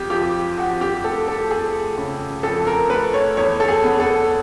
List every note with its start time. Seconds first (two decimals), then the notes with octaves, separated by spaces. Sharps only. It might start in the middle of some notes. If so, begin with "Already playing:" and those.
Already playing: F2 G4
0.10 F3 G4
0.57 F2 F#4
0.81 G4
1.04 A3 A4
1.28 A4
1.50 A3 G#4
1.98 C#3
2.43 F2 A4
2.67 A#4
2.90 A3 B4
3.14 C#5
3.37 E2 C#5
3.60 A4
3.68 G#4
3.84 B3
4.00 A4